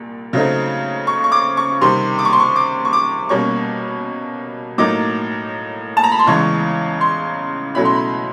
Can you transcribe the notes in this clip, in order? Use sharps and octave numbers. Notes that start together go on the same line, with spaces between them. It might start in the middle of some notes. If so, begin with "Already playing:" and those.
Already playing: C2 A#2
C#3 F#3 A3 C4 D#4
C#6
C#6
D6
C#6
C3 D#3 G3 C6
D6
C#6
C6
C#6
D6
C#6
D6
B2 G3 A#3 C#4 C#6
A2 F#3 A#3 D#4 D6
A5
A#5
B5
C6
E2 C#3 E3 G#3 C#6
C6
B2 F#3 A3 C#4 E4 B5
C6
B5